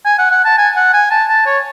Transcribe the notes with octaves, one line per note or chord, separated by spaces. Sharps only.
G#5
F#5
F#5
A5
G#5
F#5
G#5
A5
A5
C#5